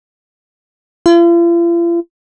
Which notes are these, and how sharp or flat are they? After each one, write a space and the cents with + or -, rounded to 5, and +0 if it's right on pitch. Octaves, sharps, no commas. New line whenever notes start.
F4 -45